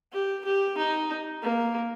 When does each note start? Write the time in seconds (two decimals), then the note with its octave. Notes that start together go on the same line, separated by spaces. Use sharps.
0.13 G4
0.45 G4
0.78 D#4
1.43 A#3